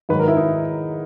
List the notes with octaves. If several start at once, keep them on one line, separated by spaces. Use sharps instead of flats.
G#2 D#3 F#3 B4
A#4
E4
D#4